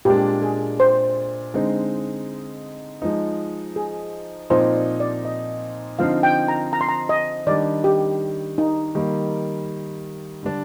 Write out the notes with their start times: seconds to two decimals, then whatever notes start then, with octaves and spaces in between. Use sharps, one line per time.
0.05 A#2 G#3 D4 G4
0.42 G#4
0.80 C5
1.54 D3 G#3 C4 D#4
3.02 F3 G#3 D#4
3.76 G#4
4.50 A#2 F3 C4 D#4 C5
4.75 D5
5.00 D5
5.25 D#5
5.98 D3 F3 C4 D#4 F5
6.23 G5
6.48 A#5
6.73 A#5
6.81 C6
6.89 A#5
7.09 D#5
7.47 D#3 G3 D4 D5
7.84 G4
8.58 D#4
8.95 D#3 G3 A#3
10.43 D3 G3 D4